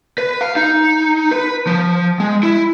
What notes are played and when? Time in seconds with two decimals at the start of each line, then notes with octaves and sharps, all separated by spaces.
0.18 B4
0.41 F5
0.56 D#4
1.31 B4
1.67 F3
2.20 G#3
2.43 E4